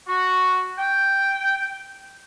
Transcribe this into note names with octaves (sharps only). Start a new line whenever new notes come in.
F#4
G5